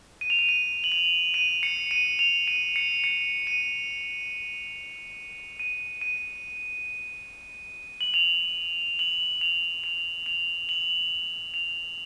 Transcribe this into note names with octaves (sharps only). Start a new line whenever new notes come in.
D#7
F7
D#7
D#7
F#7
F7
D#7
C#7
D#7
F7
D#7
C#7
C#7
D#7
D#7
D#7
F#7
F7
F#7
F7
F7
F7
F#7
F7